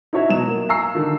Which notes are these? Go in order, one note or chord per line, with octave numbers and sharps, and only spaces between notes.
D#4 E4 F#4 C#5 D#5 E5
B2 F#3 E7
A#3
F5 G#5 A#5 C#6 E6 C7
D3 D#3